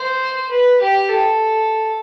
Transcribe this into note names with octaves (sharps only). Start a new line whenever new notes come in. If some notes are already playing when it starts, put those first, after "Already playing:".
Already playing: C5
B4
G4
A4